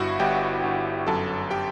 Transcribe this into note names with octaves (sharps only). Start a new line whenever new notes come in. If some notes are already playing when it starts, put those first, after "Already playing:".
Already playing: G1 G2 E4 F#4 F#5
G1 G4 G5
G1
F#2 A4 A5
G4 G5